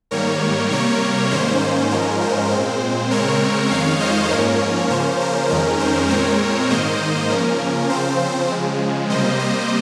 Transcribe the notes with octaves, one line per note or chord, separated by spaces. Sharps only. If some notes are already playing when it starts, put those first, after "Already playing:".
G#2 D#3 G3 A#3 A#4 C#5
C3 G3 A#3 A#4 C#5
G#2 D#3 A#3 C#4 C5
C5
G#2 F3 G#3 C#4 A#4
C5
A#2 G#3 C4 C5
C#3 G#3 C4 A#4 C#5
F2 D#3 G#3 C#5 F5
C5 D#5
G#2 F3 A#3 C#4 A#4 C#5
C#3 F3 A#3 C#4 C5
A#4
F2 D#3 G#3 C#4 A#4
C5
A#2 G#3 C4 A#4 C#5
G#2 D#3 A#3 C5 D#5
C#3 F3 A#3 C#4 A#4
C#3 F3 C4 C5
C5
C#3 F3 G#3
C3 G3 A#3 C5 D#5
C5 D#5